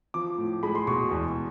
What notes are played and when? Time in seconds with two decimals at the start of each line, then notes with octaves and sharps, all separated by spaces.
0.14 F3 D6
0.38 A2
0.63 G#3 B5
0.75 C6
0.87 B2 C#6
1.11 E2